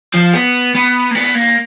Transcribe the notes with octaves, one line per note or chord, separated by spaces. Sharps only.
F3
B3
B3
A#3
B3
A#3